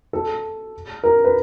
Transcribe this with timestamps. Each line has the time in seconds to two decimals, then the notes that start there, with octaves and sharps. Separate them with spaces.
0.13 A4
1.04 A#4
1.24 B4